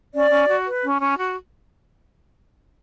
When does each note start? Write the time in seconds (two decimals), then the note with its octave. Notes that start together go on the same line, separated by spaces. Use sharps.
0.13 C#4 D5
0.30 C#4
0.48 F#4
0.66 B4
0.83 C#4
1.01 C#4
1.18 F#4